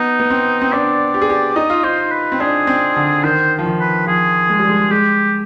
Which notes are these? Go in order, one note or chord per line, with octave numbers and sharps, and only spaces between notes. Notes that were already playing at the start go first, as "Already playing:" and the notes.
Already playing: B3 D#4
B3
C4
C4
D4 D5
G4
G#4
G4
D#4 D#5
F4
D#4 C5
B4
C4
D4 G#4
C4
D3
D#3 C5
F3
D#3
B4
F3 G#4
G#3
G3
G#3
G#3 G4